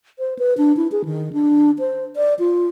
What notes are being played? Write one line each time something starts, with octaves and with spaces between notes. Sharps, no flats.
C5
B4
D4
E4
G#4
D#3
D4
C5
D5
F4